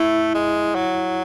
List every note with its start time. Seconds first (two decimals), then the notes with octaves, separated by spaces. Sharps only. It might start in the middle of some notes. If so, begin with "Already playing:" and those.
Already playing: A3 E4
0.34 G#3
0.75 F#3